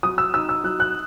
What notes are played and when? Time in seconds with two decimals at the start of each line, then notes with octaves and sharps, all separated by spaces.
0.03 F#3 D#6
0.18 E6
0.34 D#4 E6
0.49 E6
0.64 F#3 F#6
0.80 F#6